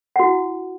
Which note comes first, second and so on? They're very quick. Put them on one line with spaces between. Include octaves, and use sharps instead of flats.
F#5 F#4 E4